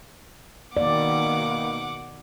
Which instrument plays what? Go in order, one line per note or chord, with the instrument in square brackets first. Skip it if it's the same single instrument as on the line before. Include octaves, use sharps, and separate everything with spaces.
[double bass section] B2 D#3 [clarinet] A#3 [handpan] D5 [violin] F#5 D6